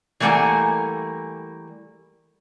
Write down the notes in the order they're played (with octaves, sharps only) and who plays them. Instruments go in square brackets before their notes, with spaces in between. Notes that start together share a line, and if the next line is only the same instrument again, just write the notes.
[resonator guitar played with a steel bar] E3 G3 A3 A#3 F#5 G#5